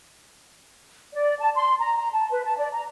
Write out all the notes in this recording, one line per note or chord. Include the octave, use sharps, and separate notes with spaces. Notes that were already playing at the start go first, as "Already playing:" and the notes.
D5
A5
C6
A#5
A#5
A5
B4
A5
D5
A#5